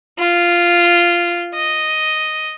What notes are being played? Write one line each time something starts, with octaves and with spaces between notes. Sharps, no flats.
F4
D#5